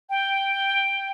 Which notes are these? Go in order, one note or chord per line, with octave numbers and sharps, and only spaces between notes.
G5